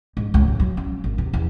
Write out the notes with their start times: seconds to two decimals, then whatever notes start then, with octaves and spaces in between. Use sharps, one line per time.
0.17 G#2
0.34 C#2
0.48 D#1
0.60 F#3
0.77 C#4
1.04 G#1
1.18 C3
1.33 E2